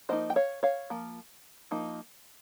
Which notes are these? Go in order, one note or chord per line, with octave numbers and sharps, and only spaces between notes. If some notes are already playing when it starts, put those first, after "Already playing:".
F3 A#3 D#4 C5 D#5
G5
C#5 F5
C#5 F5
F3 A#3
F3 A#3 D#4